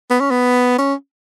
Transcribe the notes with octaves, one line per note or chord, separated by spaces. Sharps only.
B3
C#4
B3
C#4